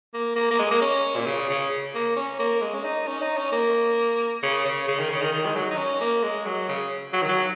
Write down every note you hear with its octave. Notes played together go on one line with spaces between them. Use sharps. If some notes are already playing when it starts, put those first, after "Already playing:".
A#3
A#3
A#3
G#3
A#3
C#4
A#2
C#3
C#3
A#3
C#4
A#3
G#3
C#4
D#4
C#4
D#4
C#4
A#3
C#3
C#3
C#3
D#3
C#3
D#3
D#3
G#3
F#3
D#4
C#4
A#3
G#3
F#3
C#3
F#3
D#3
F#3